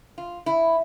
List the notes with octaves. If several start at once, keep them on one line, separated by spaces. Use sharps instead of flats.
F4
E4